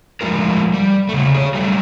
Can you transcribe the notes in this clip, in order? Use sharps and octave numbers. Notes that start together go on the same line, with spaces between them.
F3 G#3 A3 F4 A#4
G3
C#3 A3
G#4 B4 C#5
F#3 G3 A3